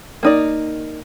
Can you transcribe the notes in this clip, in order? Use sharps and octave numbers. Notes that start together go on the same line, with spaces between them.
A#3 D#4 D5